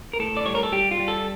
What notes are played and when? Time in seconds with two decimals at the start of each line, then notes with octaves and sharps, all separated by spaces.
0.13 A#4
0.19 A2 A4
0.37 D5
0.46 G3 C#5
0.55 A#4
0.63 A4
0.72 G3 G4
0.91 F4
1.00 G3
1.08 A4